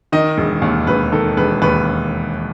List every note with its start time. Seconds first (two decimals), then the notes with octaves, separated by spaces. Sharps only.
0.12 D#3 D#5
0.38 E1
0.62 D#2
0.87 E1 B4
1.12 D#3 A4
1.37 E1 B4
1.62 D#2 B4